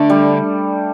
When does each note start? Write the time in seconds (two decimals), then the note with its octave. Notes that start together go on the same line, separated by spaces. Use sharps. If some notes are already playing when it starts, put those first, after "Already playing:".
Already playing: D3 A3 D4
0.10 G3